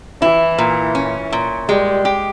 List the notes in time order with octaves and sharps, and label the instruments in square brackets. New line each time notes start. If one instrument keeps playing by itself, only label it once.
[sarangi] E3 [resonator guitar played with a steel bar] E4
[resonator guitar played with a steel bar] A#2
C#4
A#2
[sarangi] G3 [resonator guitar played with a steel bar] G#3
[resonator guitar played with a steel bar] G4